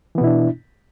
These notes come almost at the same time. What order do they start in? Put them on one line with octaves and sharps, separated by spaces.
E3 B3 B2 E4 D4